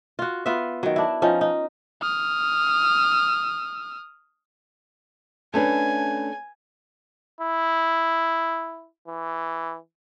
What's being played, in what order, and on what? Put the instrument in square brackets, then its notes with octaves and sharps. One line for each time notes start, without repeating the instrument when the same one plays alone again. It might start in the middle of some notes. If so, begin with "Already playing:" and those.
[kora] F4 F#4
B3 F4 B4 E5
D#3 F#3
D4 E4
F3 C#4 D#4
D#4
[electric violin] D#6 F6
[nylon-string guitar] A3 C#4 D4 [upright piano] B4 A5 [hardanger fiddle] G#5
[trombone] E4
E3